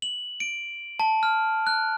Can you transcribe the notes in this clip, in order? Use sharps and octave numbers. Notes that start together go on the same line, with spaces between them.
F#7
D7
A5
F6
F#6